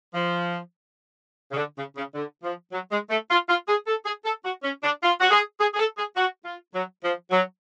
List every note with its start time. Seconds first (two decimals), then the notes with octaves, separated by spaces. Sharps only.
0.14 F3
1.52 C#3
1.57 D3
1.77 C#3
1.96 C#3
2.15 D3
2.43 F3
2.72 F#3
2.91 G#3
3.10 A3
3.30 F4
3.49 F4
3.68 G#4
3.87 A4
4.06 G#4
4.25 A4
4.45 F#4
4.63 C#4
4.83 D4
5.02 F4
5.20 F#4
5.31 G#4
5.60 G#4
5.74 G#4
5.79 A4
5.97 G#4
6.16 F#4
6.45 F4
6.74 F#3
7.03 F3
7.31 F#3